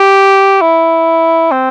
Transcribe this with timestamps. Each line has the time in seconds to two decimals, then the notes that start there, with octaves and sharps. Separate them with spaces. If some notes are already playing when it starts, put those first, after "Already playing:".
Already playing: G4
0.61 E4
1.51 C4